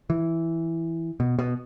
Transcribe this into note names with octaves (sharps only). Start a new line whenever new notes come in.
E3
B2
B2